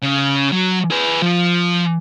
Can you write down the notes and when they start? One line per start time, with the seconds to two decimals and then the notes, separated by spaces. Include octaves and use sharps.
0.02 C#3
0.52 F#3
0.91 G#4 B4
1.22 F3